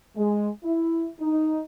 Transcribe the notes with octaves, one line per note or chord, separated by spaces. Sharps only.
G#3
E4
D#4